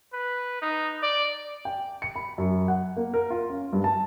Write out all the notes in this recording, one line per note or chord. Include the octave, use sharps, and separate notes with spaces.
B4
D#4
D5
G5
C#7
B5
F#2
F#5
A#3
A#4
F4
C#4
G2
A5